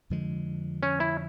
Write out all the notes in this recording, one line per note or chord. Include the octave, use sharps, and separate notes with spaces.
F2 D3 F3 G#3
C#4
E4